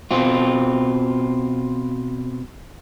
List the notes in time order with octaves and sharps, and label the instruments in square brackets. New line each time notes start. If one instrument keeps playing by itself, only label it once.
[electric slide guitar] B2 C4 F4